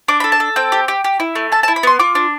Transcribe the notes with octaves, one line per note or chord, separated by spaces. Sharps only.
D4 D6
B5
A4
A5
A4
C4 G5
G4
G4
G4
E4
A3
A4 A5
A5
E4
B5
B3 C6
F4 D6
D4